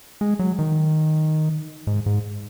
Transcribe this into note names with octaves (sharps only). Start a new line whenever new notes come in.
G#3
F#3
D#3
G#2
G#2